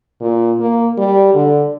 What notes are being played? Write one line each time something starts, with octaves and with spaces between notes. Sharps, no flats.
A#2
A#3
G3
D3